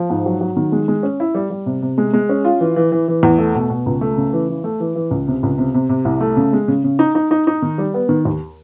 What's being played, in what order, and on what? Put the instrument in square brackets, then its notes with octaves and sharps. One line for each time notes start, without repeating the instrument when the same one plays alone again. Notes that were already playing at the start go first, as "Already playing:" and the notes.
Already playing: [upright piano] F3
G#2
F#3
F#3
D#3
G#3
G#3
C#4
E4
G3
G3
C3
C3
G#3
G#3
C#4
F4
E3
E3
E3
E3
E2
A3
B2
B2
C#2
A3
C#3
E3
E3
A3
E3
E3
C#2
C3
C#2
C3
C3
C3
C2
A3
C#3
G#3
C#3
C#3
D#4
D#4
D#4
D#4
D#3
G3
B3
D#3
D#2